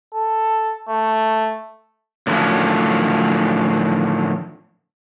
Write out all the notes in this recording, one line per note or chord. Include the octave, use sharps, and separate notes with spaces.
A4
A3
A2 D3 D#3 F3 F#3 C#4